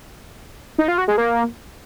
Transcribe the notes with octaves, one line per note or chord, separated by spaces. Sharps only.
D#4
F4
F#4
G#3
A#3